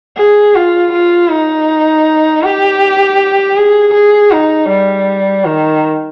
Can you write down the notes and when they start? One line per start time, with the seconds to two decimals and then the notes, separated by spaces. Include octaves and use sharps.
0.17 G#4
0.55 F4
0.93 F4
1.30 D#4
2.43 G4
3.57 G#4
3.94 G#4
4.32 D#4
4.70 G3
5.46 D#3